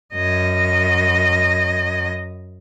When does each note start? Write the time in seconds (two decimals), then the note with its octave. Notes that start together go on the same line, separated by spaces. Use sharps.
0.15 F#2 D#5